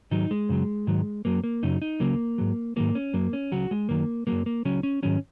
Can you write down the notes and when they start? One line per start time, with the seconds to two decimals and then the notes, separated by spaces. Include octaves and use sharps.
0.11 G#2 D#3 F#3 D#4
0.31 G#3
0.49 F#2 C#3 F#3
0.87 G#2 D#3 F#3
1.25 F#2 F#3 A#3
1.44 A#3
1.63 F#2 C#3 F#3 D#4
1.82 D#4
2.00 C#2 C#3 F#3 A#3
2.38 G#2 F#3
2.76 G#2 D#3 F#3 A#3
2.95 C#4
3.13 F#2 F#3 A#3
3.33 C#4
3.52 C#2 C#3 F#3 F#4
3.71 G#3
3.89 F#2 D#3 F#3 A#3
4.27 F#2 F#3 A#3
4.46 A#3
4.65 C#2 C#3 F#3 C#4
4.83 C#4
5.03 G#2 D#3 F#3 C#4